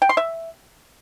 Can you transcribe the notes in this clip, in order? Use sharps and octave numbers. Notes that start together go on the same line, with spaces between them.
G5
C6
E5